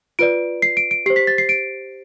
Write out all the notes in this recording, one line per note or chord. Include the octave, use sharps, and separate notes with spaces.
F4 B4 D5 D7
C7
D7
D7
G4 C5 C7
B6
A6
C7
D7